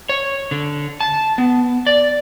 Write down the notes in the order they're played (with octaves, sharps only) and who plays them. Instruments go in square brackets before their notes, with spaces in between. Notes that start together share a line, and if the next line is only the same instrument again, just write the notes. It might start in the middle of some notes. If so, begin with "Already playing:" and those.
[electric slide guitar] C#5
D3
A5
B3
D5